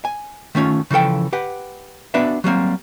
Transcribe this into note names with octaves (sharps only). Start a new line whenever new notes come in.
G#5
D#3 A3 C#4 F4
C#3 E3 F3 A4 G5
G4 B4 F#5
B3 D4 F#4 B4 D5 E5
F#3 G3 A#3 C4